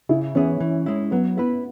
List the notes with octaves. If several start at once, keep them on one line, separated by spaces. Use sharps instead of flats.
C#3 E4
E3 B3 C#4 G#4
E3
G#3 E4
F#3 B3
B3 E4 B4